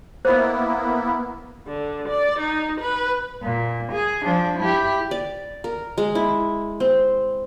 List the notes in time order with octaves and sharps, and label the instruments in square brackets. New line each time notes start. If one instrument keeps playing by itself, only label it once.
[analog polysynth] A#3 B3 E4 [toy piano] C5 D#5
[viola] D3
D5
D#4
B4
[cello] A#2
G#4
F3 D4
E4 G4
[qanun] D5
A#4
G#3
E4
C4